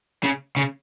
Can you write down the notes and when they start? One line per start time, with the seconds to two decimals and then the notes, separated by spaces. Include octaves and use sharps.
0.24 C#3
0.56 C#3